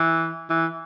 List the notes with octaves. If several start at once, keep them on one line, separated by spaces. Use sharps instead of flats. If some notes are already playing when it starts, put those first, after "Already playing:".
Already playing: E3
E3